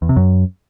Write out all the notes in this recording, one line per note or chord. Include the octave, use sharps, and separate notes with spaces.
E2
C3
F#2